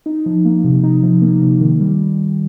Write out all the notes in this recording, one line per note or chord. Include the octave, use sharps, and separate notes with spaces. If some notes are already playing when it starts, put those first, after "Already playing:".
D#4
F3
A#3
C3
D#4
F3
A#3
C3
D#3
G3